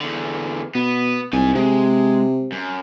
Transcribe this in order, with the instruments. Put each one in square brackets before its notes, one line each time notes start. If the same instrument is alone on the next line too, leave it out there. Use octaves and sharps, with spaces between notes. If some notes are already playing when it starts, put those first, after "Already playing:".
[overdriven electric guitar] E2 D3
[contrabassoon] B2 [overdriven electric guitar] B3
[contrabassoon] C2 [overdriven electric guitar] D#4 G#5
[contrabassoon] C3 [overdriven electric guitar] G#3
[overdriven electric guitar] F#2